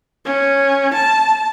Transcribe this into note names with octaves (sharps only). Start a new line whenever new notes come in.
C#4
A5